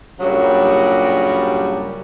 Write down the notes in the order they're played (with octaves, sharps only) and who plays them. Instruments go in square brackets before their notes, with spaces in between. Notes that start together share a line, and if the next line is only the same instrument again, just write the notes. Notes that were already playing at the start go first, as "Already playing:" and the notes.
[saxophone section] G2 A#2 C#3 F#3 G3